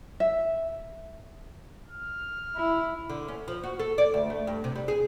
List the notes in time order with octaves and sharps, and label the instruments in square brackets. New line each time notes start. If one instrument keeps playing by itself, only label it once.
[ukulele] E5
[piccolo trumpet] F6
[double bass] E4
[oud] D3
C#4
F3
F#4
A4
D5
D2
A3
G2
C3
G3
G#4